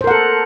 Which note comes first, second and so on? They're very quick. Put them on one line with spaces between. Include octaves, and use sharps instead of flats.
C5 A#4 F#5 A4